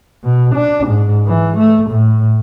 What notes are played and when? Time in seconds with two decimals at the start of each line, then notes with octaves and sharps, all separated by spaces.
0.24 B2
0.55 D4
0.87 G#2
1.26 E3
1.57 A3
1.91 A2